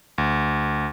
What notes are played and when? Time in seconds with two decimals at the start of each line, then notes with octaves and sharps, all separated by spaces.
0.18 D2